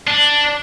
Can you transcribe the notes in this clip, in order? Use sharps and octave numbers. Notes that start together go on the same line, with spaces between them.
D4